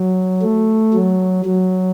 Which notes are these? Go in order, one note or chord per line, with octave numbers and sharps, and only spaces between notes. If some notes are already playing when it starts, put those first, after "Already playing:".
Already playing: F#3
A3
F#3
F#3